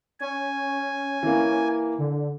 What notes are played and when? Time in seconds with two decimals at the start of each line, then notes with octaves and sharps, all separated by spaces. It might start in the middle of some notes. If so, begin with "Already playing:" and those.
0.20 C#4 G#5
1.23 E3 A#3
1.98 D3